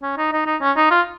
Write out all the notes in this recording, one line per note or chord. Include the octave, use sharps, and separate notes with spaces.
C#4
D#4
D#4
D#4
C#4
D#4
F4